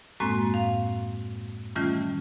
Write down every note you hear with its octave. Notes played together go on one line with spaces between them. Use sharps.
F#2 A2 G#3 A#3 C4 F#4
F5
D#3 E3 G3 A3 C#4 F4